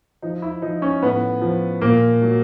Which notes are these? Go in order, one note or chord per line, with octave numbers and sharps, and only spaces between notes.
F3 D#4
E4
F3 D#4
C#4
A2 B3
F3
A#2 A#3
F#3